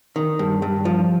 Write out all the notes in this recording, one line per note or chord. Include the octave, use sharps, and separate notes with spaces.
D#3
G2
G2
F3